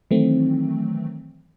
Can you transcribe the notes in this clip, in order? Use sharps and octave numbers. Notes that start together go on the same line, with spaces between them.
D#3 E3 F#3 A3 C4